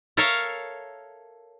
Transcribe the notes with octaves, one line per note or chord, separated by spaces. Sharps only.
A4 A#4 C#5 E5 F5